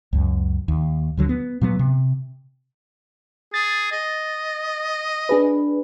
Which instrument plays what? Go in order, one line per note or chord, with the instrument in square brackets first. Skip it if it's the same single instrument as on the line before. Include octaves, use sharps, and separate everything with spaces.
[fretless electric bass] C#2 F#2
D#2
D2 D3 F#3
B3
A#2 F#3 B3
C3
[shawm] G#4 [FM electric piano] A6
[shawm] D#5
[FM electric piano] D4 G#4 B4